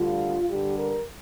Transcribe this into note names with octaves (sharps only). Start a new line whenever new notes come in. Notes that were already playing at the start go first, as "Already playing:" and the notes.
Already playing: D2 D3 G3 F4
G2 D3 G3 G4
A#4